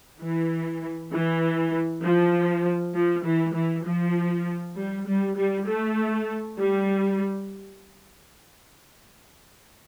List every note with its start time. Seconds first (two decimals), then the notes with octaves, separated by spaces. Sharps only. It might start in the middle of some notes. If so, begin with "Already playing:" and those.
0.21 E3
1.12 E3
2.03 F3
2.95 F3
3.25 E3
3.54 E3
3.85 F3
4.76 G3
5.07 G3
5.37 G3
5.67 A3
6.58 G3